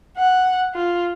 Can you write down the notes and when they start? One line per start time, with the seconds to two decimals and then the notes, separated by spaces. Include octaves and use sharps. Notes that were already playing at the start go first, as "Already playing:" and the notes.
0.17 F#5
0.74 F4